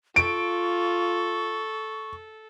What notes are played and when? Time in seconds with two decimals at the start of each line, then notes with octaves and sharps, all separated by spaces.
0.16 F4 A4 C#6 D7